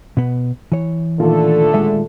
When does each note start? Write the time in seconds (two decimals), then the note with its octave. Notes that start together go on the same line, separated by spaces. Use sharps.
0.17 B2 B3
0.72 E3 C#5
1.20 A#2 D3 D#3 A3 F4 A4
1.74 G#3 E5